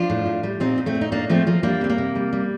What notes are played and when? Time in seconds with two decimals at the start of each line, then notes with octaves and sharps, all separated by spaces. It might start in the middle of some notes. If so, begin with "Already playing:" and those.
Already playing: F3 D4 F4
0.10 A2
0.26 A2
0.43 G3
0.60 A#2 C4 D#4
0.78 A#2
0.86 A3 C4
0.95 A#2
1.01 D#4
1.12 A2 A#3 D4
1.29 F3 A3 C4
1.47 F3 A#3
1.63 G3 A#3 D4
1.81 C3 C4
1.90 A#3
1.98 C3
2.15 G3
2.33 G3